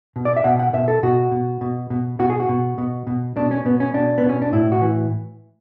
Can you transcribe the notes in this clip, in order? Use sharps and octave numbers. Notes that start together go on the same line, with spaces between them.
B2
D5
E5
B2 F#5
F#5
B2 E5
A4
B2 F#4
B2
B2
B2
B2 F#4
G#4
F#4
B2
B2
B2
B2 D4
C#4
B2 B3
C#4
B2 D4
B3
B2
C#4
D4
A2 E4
F#4
E3